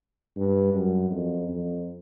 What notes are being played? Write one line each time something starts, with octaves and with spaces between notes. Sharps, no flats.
G2
F#2
F2
F2